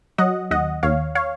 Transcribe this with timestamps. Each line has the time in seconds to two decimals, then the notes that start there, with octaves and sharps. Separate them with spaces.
0.18 F#3 D#5 F#5
0.51 D#2 D#5 F#5
0.83 D#2 C#5 F5
1.15 C#5 F5